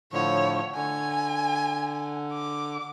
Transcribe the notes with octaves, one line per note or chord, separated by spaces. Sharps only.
A2 D3 F3 C#5
D3 G#5
D6